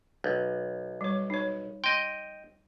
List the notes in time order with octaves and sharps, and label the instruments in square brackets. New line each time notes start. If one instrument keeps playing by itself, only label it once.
[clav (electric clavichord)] B1
[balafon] G3 C#5
D#4 C#5
[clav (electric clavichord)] D#5 G5 [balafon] C6